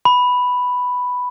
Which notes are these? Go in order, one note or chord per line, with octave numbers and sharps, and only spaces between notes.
B5